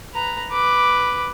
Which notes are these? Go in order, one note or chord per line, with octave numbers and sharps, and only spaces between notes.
B4 A#5
B4 D6